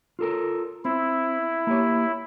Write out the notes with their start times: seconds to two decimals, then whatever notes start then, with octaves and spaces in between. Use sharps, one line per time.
0.19 F4 A4 A#4
0.85 C4 E4
1.67 A#3 G4 C#5